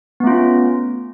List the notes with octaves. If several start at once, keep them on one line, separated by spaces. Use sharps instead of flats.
A3 B3 C#4 F4